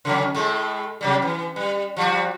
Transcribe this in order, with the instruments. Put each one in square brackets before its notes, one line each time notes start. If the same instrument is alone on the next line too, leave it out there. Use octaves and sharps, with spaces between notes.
[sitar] C#3 F#3 C#4
A2 G#3 A3
C3 F#3 G3
E3
G3
F3 G3 F#4